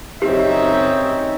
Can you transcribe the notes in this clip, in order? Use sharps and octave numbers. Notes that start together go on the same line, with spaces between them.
F#2 C#3 C4 C#4 D#4 G4 E5